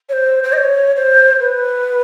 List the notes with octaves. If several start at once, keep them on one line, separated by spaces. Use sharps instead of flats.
C#5
C5
C5
D#5
C#5
C5
B4